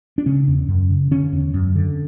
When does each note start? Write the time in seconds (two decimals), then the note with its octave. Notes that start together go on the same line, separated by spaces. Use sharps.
0.18 D4
0.26 C#3 C#4
0.48 E2
0.69 F#2
0.90 C#3
1.11 D3 C#4
1.32 E2
1.54 F#2
1.76 D3